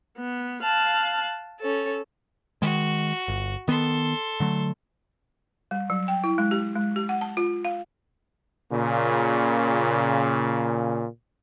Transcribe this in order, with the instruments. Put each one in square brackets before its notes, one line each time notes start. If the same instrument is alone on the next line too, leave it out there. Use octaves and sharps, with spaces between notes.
[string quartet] B3
F5 A5 F#6
C#4 A4
[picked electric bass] D#3 G#3 [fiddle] F#4
[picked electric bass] G1
[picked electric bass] D#3 B3 [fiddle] A4 C6
[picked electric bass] D3 F#3 A3
[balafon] G3
F#3
G5
E4
G#3
G4
G#3
G4
F#5
A5
F4
F5
[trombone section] A#2 C#3